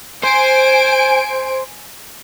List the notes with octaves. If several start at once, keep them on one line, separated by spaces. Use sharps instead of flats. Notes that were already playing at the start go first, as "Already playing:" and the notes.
C5 G#5 D7